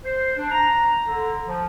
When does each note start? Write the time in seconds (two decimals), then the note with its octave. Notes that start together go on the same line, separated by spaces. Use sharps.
0.03 C5
0.36 D4
0.52 A#5
1.06 D3
1.46 F3